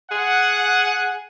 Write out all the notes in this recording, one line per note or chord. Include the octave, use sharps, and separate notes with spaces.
G#4 F#5